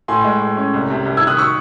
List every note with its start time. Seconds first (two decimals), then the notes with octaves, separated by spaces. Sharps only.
0.08 A2 G#5 C6
0.25 G#3
0.40 A2
0.57 C#4
0.74 C2
0.90 C3
1.05 C2
1.17 E6 G#6
1.22 D#3
1.27 D#6 F#6
1.38 C#6 E6